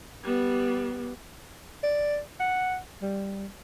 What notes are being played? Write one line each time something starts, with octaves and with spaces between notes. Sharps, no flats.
G3 B3
D5
F#5
G3